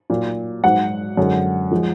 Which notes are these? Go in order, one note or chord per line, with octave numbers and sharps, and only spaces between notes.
A#2 F#3
G#2 F#3 F#5
F#2 D3 G#3
F3 G#3